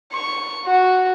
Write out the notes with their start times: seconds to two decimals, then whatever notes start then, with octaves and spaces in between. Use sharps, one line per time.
0.12 C#6
0.66 F#4